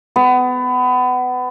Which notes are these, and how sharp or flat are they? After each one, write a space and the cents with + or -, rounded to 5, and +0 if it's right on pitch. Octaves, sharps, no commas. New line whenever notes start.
B3 +25